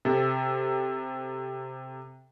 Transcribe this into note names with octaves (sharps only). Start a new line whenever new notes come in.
C3 A4